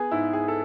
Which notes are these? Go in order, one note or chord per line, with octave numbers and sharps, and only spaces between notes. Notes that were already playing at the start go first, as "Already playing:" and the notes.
Already playing: B3 G#4
G#2 E4
G#4
A4